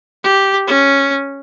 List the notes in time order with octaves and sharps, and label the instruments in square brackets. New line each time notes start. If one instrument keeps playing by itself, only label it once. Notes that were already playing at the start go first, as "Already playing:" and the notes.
[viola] G4
C#4